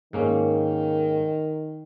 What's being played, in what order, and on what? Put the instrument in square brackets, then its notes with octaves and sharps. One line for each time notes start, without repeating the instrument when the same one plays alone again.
[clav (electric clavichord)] G#2 A#3 C#4 [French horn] D#3